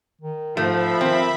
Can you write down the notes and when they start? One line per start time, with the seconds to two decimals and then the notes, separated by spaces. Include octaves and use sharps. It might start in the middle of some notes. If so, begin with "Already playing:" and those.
0.22 D#3
0.57 G#2 F3 A3 E5 B5
1.01 D#3 C4